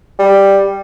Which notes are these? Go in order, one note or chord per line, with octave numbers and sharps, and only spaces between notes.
G3